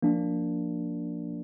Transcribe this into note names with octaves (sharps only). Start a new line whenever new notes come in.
F3 A#3 D4